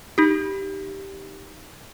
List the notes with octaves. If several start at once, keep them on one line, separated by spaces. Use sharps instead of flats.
D#4 G4